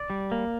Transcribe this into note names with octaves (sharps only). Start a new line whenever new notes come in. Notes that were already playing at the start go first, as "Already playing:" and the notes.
Already playing: D5
G3
A#3